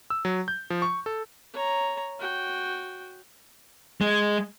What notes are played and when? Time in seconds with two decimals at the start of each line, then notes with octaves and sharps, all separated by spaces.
0.10 E6
0.25 F#3
0.48 G6
0.70 F3
0.82 C#6
1.06 A4
1.53 C#5 A#5
2.19 F#4 G5
4.01 G#3